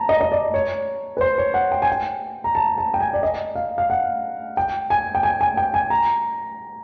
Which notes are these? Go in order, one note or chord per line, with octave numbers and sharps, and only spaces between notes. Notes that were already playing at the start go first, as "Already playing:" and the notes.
Already playing: A5 A#5
D#5
D#5
D5
C#5
B4
C5
C#5
F#5
G5
G#5
G5
A#5
A5
A5
G5
G#5
D5
D#5
F5
F5
F#5
G5
G#5
G5
G#5
G#5
G5
G#5
A#5